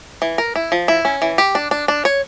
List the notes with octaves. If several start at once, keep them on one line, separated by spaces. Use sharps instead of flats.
E3
A#4
E4
F3
E4
C#4
E3
G4
D4
D4
D4
C#5